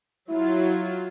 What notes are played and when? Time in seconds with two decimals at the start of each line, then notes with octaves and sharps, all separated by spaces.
0.29 F#3 E4 F4